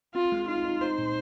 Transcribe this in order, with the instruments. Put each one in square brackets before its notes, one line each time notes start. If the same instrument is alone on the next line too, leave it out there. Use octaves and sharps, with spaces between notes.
[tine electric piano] C4 [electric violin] F4
[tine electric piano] G#3
[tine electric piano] D#4 [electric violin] F4
[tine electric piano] D#4
[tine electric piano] D#4 [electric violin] C5
[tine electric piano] A#2